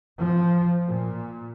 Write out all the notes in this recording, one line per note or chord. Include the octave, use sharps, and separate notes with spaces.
F3
A#2